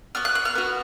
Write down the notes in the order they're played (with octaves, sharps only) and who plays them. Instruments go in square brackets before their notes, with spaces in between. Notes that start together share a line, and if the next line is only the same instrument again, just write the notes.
[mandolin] B3 F#4 F6
F#6
F#6
F6
B3 F#4